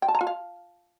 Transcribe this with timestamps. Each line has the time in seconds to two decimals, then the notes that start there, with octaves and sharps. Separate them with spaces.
0.02 G5
0.08 A5
0.15 A#5
0.21 F4
0.27 F5